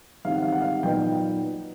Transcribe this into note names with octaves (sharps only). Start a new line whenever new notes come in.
G#2 D#3 G3 C4 E4 F5
F#5
F5
F#5
F5
A#2 F#3 B3 D#4 G5